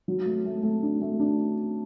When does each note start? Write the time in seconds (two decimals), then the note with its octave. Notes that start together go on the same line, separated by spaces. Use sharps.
0.08 F#3
0.25 A3
0.45 A3
0.63 A3
0.83 D4
1.02 A3
1.20 D4